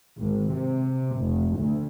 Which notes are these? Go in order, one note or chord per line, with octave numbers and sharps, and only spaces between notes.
G#1
C3
F1
D2